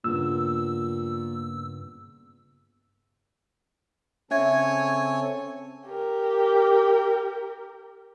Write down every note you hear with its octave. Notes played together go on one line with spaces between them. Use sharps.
G2 A#2 C#3 B3 E6
C#3 C4 C#4 A4 C#5 E5 G#5 G#6
G4 A#4